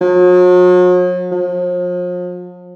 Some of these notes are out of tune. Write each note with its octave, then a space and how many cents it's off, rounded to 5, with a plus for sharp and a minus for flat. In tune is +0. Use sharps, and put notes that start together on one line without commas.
F#3 -45
F3 +40